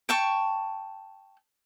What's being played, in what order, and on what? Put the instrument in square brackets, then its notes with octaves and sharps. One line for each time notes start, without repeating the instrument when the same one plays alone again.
[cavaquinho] G5 A5 C#6